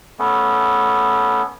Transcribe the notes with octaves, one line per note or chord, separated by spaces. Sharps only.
A3 B3 C#4